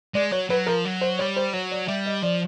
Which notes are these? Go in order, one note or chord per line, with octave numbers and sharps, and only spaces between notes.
G#3 D5
F#3 C#5
F#3 B4
F3 A#4
F#3
C5
G3 C#5
C5
F#3 C#5
D5
G3 E5
D#5
F3 D5